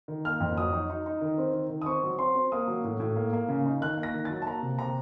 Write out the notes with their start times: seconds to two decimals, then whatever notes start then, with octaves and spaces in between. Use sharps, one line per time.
0.08 D#3
0.25 A#3 F6
0.40 F2
0.57 F#3 D#6
0.73 D#4
0.90 D#4
1.06 D#4
1.21 D#3
1.38 C4
1.54 D#3
1.70 D#3
1.82 D#6
1.86 C4 C#6
2.03 F#3
2.19 C4 C6
2.35 C4
2.52 A#3 D#6
2.68 F#3
2.84 A2
3.00 A2
3.16 A#3
3.33 A#3
3.48 C#3
3.66 D#4
3.81 D#3 F#6
3.97 A#3
4.03 A#6
4.14 D#3
4.25 F#3 A6
4.42 A5
4.46 A#3 A#5
4.62 C3
4.78 C3 A#5